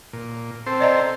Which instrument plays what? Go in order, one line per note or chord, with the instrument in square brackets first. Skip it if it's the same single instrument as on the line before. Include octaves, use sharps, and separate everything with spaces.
[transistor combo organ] A#2
C4 A4 C5
[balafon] D5 D#5 A#5